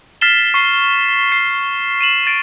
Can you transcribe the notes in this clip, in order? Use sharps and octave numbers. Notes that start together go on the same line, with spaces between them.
F6 A6 B6 C7 E7 G7
C#6 C7
C7
D#7 E7 F#7
A6 D7